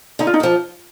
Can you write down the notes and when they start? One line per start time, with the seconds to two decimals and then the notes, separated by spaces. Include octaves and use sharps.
0.19 D3 D#4
0.27 F4
0.34 D#4
0.40 F3 A#3